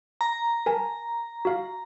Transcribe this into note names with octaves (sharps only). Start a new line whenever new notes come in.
A#5
A#4 G#5 A5
F#4 F5